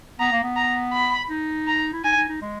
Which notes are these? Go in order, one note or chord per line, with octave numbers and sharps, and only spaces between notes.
B3 A#5
A#3
B3
A#5
B5
D#4
A#5
E4
D#4 G#5
D#4
D#4
G#3